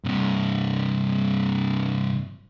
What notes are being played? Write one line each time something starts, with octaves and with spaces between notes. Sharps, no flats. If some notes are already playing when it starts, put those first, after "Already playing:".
G2 C3